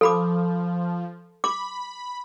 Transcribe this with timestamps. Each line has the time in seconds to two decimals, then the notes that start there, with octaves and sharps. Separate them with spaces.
0.01 F3 A4 B5 D6
1.44 B5 D6